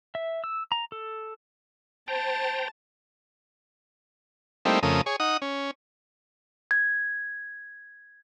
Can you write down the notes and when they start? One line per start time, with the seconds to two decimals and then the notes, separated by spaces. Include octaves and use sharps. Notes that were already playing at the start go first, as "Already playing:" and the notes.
0.15 E5
0.44 E6
0.72 A#5
0.92 A4
2.08 C5 G5 A5 A#5
4.65 G3 A3 A#3 C4 D#4 E4
4.83 F2 C#3 A3 A#4 D#6
5.06 G#4 C#5
5.20 D#4 F#5 D#6
5.42 C#4
6.71 G#6